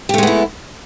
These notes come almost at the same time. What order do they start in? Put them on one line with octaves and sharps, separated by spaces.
G4 A3 G#3 B3 E4